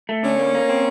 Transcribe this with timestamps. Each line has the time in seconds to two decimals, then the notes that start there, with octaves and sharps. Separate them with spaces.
0.09 A3
0.23 D3 C#4
0.39 A#3
0.54 A#3
0.69 C4